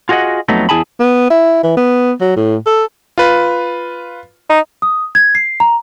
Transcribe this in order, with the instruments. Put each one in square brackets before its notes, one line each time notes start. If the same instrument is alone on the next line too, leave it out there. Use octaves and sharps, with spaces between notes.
[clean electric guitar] F4 F#4 G#4 C5 D#5 F#5
F2 F#3 A3 B3 D#4
E2 E4 G#4 G#5 A5 B5
[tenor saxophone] B3
E4
E3
B3
F#3
A2
A4
[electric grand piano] F4 B4
[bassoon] D#4
[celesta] D#6
G#6
C7
A#5